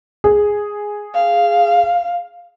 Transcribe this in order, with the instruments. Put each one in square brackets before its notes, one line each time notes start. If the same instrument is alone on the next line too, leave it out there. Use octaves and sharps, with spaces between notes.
[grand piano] G#4
[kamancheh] F5